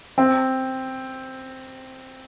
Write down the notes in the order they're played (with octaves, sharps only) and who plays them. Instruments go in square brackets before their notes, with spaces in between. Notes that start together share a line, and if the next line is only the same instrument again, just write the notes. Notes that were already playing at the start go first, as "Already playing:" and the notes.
[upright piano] C4